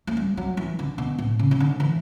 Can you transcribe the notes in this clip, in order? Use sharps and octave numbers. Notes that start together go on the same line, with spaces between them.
A3
G3
F#3
E3
D3
B2
A2
C#3
C#3
D3
E3